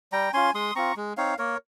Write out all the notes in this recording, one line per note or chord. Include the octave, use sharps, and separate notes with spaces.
G3 G5 A#5
C#4 F4 G#5 C6
G#3 C6 D#6
C4 F4 A#5 C#6
G#3
C4 D#4 C#5 F5
A#3 A#4 C#5